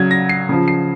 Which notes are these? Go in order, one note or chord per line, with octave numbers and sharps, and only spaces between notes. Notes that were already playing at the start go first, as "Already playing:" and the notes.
Already playing: C#3 F#3 G#6
A#6
C7
C#3 F3
C7